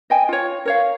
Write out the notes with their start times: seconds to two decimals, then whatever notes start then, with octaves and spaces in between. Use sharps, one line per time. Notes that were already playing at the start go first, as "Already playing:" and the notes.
0.10 D#5 G5 G#5
0.29 F4 C#5
0.65 A#4 C#5 F5